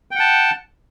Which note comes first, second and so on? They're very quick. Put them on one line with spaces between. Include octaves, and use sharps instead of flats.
G5 F#5 A5